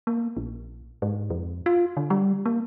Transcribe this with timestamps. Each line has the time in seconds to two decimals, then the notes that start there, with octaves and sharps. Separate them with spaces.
0.07 A#3
0.37 A#1
1.02 G#2
1.30 F2
1.66 F4
1.97 D3
2.10 G3
2.46 A#3